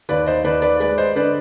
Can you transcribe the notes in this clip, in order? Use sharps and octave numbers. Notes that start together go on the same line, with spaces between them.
D#2 B4 D5
C5 D#5
D#2 B4 D5
B4 D5
G#3 B4 D5
C5 D#5
D3 B4 D5